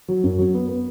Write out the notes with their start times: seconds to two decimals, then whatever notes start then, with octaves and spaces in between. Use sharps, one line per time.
0.08 F#3
0.24 F#2
0.39 F#3
0.55 B3
0.69 B3